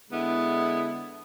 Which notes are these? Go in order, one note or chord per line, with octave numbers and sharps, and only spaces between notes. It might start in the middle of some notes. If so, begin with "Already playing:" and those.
D3 G#3 B3 E4